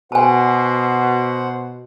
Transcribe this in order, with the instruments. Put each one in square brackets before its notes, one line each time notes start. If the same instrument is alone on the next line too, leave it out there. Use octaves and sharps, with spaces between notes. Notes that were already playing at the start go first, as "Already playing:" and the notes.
[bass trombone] B2 [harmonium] C5 F#5 [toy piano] G#5 A5